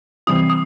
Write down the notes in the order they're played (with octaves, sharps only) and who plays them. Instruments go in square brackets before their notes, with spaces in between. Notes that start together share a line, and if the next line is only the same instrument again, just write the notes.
[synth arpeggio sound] C3 E3 G3 C4 E4 [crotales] D#6
[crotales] D#6